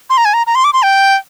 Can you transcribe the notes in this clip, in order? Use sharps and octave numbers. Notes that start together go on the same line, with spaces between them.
C6
A#5
G#5
A#5
A#5
C6
D6
C6
G5